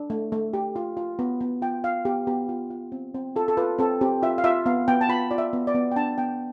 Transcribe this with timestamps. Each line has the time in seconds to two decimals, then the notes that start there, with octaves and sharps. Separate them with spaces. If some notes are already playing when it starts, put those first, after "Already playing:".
Already playing: D4
0.10 A3
0.32 A3
0.53 G4
0.76 F4
0.97 F4
1.19 B3
1.40 B3
1.62 F4 G5
1.84 F4 F5
2.05 B3 G4
2.27 B3 G4
2.49 F4
2.70 F4
2.92 C4
3.14 C4
3.36 F4 A4
3.48 A4
3.57 F4 B4
3.79 C4 A4
4.01 C4 G4
4.22 F4 E5
4.38 F5
4.44 F4 E5
4.66 B3 F5
4.88 B3 G5
5.01 A5
5.09 F4 B5
5.31 F4 D5
5.38 E5
5.53 B3
5.67 D5
5.75 B3
5.91 G5
5.96 D4 A5
6.18 B3 G5